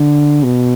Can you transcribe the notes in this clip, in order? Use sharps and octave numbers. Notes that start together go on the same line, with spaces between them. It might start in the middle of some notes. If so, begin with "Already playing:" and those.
Already playing: D3
B2